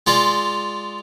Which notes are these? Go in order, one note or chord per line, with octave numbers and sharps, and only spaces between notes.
G#3 F4 D5